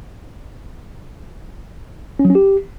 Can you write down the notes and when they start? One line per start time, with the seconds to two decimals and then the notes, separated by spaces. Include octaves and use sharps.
2.19 C#4
2.25 F#3
2.30 C#4
2.35 G4